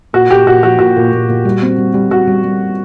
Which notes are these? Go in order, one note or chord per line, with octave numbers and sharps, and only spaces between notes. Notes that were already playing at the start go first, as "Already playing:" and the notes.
A#2 F#4
A#2 G4
A#2 F#4
F3 F#4
A#2 F#4
A#2
A#2
A#2
G3
C4
G3
G3
G3 F#4
G3
G3